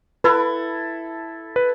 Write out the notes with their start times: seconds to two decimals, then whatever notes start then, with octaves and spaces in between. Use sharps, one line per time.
0.24 E4 A4 B4
1.56 B4